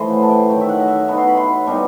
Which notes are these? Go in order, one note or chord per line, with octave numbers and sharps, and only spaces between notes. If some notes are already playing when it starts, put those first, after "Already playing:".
Already playing: A2 E3 C5 D#5
F#5
A5
G5
D#3 F#3 A3 G5
E5
F#5
D#5
E5
B2 F#3 B3 D#4
C6
B5
C6
B2 G3 B3 D#4